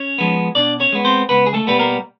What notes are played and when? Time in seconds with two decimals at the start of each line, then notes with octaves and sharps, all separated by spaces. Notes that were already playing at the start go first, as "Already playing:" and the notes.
Already playing: C#4 C#5
0.18 F3 G#3 B3
0.55 B2 D4 D5
0.80 C#4 C#5
0.93 G#3 B3
1.05 C4 C5
1.29 C#2 B3 B4
1.46 G#4
1.54 A3 A4
1.67 B2 G3 B3 B4
1.79 A#3 A#4